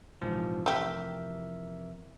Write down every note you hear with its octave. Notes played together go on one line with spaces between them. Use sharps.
A#1 F2 G#2 C3 E3 F3
A3 G4 A#4 E5